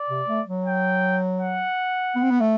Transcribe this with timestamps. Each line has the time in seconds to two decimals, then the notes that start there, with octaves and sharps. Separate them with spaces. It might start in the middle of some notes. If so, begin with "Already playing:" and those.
Already playing: D5
0.09 C3
0.28 A3
0.47 F#3
0.65 G5
1.40 F#5
2.16 B3
2.23 C4
2.30 B3
2.41 A3